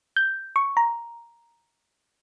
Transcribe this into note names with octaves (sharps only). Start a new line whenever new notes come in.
G6
C#6
A#5